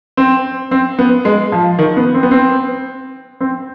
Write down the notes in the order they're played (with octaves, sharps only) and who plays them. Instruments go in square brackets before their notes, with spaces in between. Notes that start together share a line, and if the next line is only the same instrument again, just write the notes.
[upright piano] C4
C4
B3
G#3
F3
D#3
B3
C4
B3
C4
C4